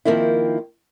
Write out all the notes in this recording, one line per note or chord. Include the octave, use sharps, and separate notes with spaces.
D#3 F3 A#3 C4 E4